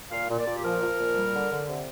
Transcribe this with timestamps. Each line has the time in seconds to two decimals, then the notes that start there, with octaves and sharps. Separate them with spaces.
0.11 A#2 F5
0.29 A#2
0.38 D5
0.46 A#2
0.56 G4
0.64 F3 A#4
0.82 F3
0.99 A#2
1.16 G3
1.34 D3
1.51 D3
1.68 C3